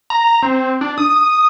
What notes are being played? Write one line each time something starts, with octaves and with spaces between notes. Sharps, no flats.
A#5
C4
D4
D#6